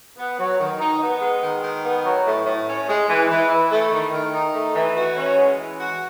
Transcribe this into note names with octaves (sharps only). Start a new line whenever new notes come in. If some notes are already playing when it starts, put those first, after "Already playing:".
B3
F#3
D#3
D#4
B3
G#3
D#3
D#3
B3
F#3
A2
A2
C#4
G#3
E3
E3
E4
A3
D#3
D#3
D#4
A3
E3
F#4
C#4
G#3
E3
F#4